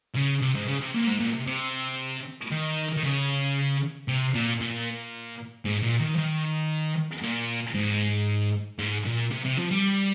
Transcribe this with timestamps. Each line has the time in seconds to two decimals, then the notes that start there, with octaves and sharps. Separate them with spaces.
0.15 C#3
0.41 C3
0.55 G#2
0.67 C#3
0.80 C3
0.94 A#2
1.07 G#2
1.20 A#2
1.33 C3
1.46 C3
2.51 D#3
2.96 D#3
3.03 C#3
4.08 C3
4.34 A#2
4.61 A#2
5.65 G#2
5.83 A#2
5.99 D#3
6.18 D#3
7.23 A#2
7.74 G#2
8.79 G#2
9.06 A#2
9.31 C3
9.45 C3
9.57 F3
9.71 G3